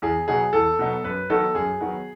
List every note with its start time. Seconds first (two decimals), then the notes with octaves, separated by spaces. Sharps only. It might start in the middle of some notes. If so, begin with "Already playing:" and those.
0.02 E2 G#4
0.28 B2 F#3 B3 D#4 G#4
0.53 E2 A4
0.79 B2 F#3 B3 D#4
1.04 F#2 B4
1.30 D#3 F#3 B3 D#4 A4
1.55 F#2 G#4
1.80 D#3 F#3 B3 D#4